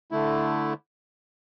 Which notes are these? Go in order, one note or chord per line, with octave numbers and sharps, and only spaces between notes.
D3 A3 E4